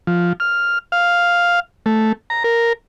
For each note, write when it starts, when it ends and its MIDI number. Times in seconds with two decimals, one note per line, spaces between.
0.07 0.33 53
0.40 0.78 89
0.92 1.60 77
1.86 2.12 57
2.30 2.43 82
2.44 2.73 70